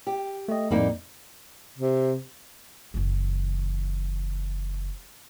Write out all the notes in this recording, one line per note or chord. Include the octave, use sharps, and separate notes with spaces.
G4
A3 D#5
F2 A2 G3 A#3 D#4
C3
F#1 E3